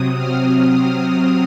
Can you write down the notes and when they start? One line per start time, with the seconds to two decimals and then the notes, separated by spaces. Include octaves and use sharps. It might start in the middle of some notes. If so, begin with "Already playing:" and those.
Already playing: C3 F#3 C4 D#6
0.18 F6
0.54 F6
0.90 F6